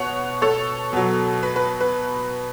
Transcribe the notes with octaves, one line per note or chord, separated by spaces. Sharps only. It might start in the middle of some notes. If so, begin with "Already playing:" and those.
Already playing: B2 C#5 F#5
A4 C#5
B2 F#3
B4
B4
B4